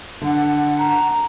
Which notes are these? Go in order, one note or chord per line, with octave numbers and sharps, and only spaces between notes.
D3 F#5
A#5